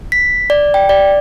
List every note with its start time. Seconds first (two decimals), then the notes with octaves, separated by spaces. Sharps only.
0.12 B6
0.50 D5
0.74 G5
0.89 D5